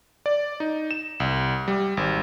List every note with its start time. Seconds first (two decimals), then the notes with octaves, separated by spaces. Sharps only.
0.26 D5
0.60 D#4
0.91 E7
1.20 C2
1.68 G3
1.97 G#1